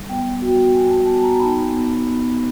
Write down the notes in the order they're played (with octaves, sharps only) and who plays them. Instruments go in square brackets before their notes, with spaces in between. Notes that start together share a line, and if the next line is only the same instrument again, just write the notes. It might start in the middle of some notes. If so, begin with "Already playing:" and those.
Already playing: [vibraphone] G3
B3 G5
F#4
B3 G#5
A5
B3 A5
A#5
D#4 B5
B3
B3